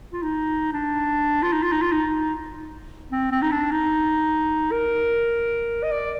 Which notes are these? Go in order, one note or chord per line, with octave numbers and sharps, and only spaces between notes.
F4
D#4
D4
F4
D#4
F4
D#4
F4
D#4
C4
C4
D#4
D4
D#4
A#4
D#5
D5